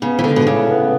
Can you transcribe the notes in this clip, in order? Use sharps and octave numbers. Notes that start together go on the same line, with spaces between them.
C#3 B3
E3
D3 G#3
B2
A2 C#3
B3